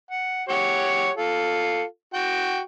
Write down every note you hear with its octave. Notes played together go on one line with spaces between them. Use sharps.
F#5
G4 C#5 F#5
F4 A4
F#4 G5